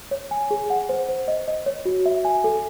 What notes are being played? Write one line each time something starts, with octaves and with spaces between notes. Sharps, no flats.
C#5
G#5
G#4
F#5
C5
C5
D#5
D#5
C#5
F#4
E5
G#5
A4